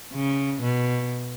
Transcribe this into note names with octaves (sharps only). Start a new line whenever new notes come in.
C#3
B2